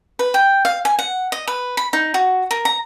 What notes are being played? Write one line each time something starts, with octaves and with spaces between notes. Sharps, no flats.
B4
G5
F5
G#5
F#5
D#5
B4
B5
D#4
F#4
A#4
A#5